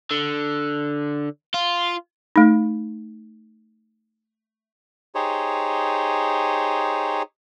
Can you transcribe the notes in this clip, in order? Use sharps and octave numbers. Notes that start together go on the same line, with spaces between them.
D3
F4
A3 D#4
D#4 G4 G#4 C5 C#5